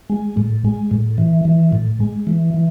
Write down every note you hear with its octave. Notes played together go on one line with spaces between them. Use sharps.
G#3
A2
G#3
A2
E3
E3
A2
G#3
E3
E3